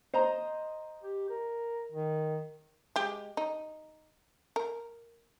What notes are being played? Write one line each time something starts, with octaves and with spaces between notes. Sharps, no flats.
C5 D#5 A#5
G4
A#4
D#3
G#3 G4
D#4
A#4